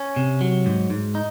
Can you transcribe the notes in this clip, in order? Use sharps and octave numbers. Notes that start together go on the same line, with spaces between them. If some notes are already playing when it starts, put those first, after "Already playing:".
Already playing: C#4
C3
F#3
G#2
G#2
D#4